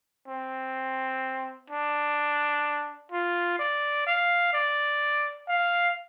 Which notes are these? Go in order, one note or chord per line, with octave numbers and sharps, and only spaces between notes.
C4
D4
F4
D5
F5
D5
F5